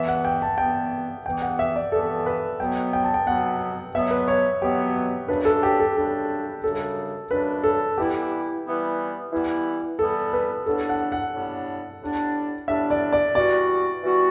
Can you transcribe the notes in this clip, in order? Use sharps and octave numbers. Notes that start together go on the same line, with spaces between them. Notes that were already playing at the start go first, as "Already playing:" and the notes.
Already playing: G2 E3 B3 E5
F#5
G5
A5
G2 E3 B3 G5
G2 E3 B3 G5
F#5
E5
D5
G2 E3 B3 A4
B4
B2 F#3 B3 G5
G5
A5
G5
B2 F#3 B3 F#5
B2 F#3 B3 E5
B4
C#5
B2 F#3 B3 G4
F#2 C#3 G3 D4 B4
A4
G4
A4
F#2 C#3 G3 D4 A4
F#2 C#3 G3 D4 A4
F#2 C#3 G3 D4 B4
A4
E3 G3 B3 E4 G4
E3 G3 B3 E4
E3 G3 B3 E4
E3 G3 B3 E4 A4
B4
A2 G3 B3 D4 A4
F#5
F#5
A2 G3 B3 D4
A2 G3 B3 D4
A2 G3 B3 D4 E5
D5
D5
E3 G3 B3 F#4 D5
E3 G3 B3 F#4